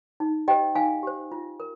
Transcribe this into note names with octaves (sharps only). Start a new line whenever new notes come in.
D#4
G4 C5 D#5 G5
D#4 F5 G#5
G4 C5
F4
A#4